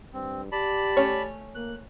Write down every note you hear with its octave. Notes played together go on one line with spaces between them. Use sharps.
G2 C4
G4 D5 A5 B5
A3 C#4 C#5
A#3 F#6